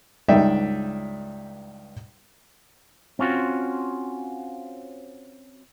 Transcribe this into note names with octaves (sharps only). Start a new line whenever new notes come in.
C#2 G2 D#4 D5 E5 G5
C4 C#4 F4 F#4